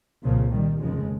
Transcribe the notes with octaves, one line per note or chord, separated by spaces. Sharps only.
C2 A#2 C#3 F3
D#3 G3
F1 D#2 C#3 F3 G#3